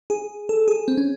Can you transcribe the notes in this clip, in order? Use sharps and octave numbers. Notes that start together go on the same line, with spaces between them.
G#4
A4
G#4
C4
C#4